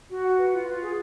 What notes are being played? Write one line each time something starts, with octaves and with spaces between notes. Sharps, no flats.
F#4
F#5
B4
F4
F4
G#4